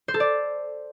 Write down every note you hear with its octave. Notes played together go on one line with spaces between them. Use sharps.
C5
A4
D5